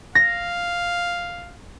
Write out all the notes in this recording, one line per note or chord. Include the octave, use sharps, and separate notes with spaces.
F5 A#6